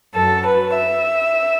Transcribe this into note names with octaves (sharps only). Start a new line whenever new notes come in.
F#2 F#3 A4
B4
E5